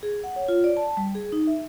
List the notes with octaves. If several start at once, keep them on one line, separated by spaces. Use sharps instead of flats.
G#4
F#5
C#5
F4
D5
A5
G3
G#4
D#4
E5